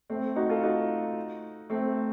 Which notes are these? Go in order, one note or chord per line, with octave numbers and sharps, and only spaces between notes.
A3 C4
D#4 F#4
F4 A4
D#4 F#4
A3 C4